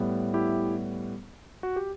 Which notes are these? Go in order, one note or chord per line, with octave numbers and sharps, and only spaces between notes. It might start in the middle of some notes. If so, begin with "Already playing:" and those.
Already playing: A2 G3 B3
E4 G4
F#4
G4